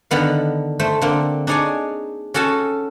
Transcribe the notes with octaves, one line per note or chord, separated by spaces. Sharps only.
D3 D#3 B3 F5
A3 C5
D3 A#3 C4
D4 D#4 G#4 C#5 D5 G#5
C#4 F#4 A4 G#5 A5